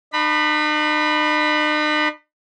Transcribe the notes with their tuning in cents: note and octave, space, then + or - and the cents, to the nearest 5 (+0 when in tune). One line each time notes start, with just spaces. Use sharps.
D#4 -45 B5 +0